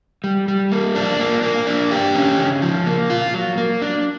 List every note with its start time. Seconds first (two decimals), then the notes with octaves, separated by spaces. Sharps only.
0.24 G3
0.48 G3
0.72 A#3
0.95 D4
1.20 A#3
1.42 A#3
1.67 D4
1.91 G4
2.15 C#4
2.38 C#3
2.62 F3
2.87 A#3
3.10 F4
3.34 F#3
3.58 A#3
3.82 D4